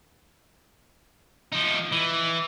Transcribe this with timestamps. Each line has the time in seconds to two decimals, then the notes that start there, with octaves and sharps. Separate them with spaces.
1.52 F3 D#4
1.92 E3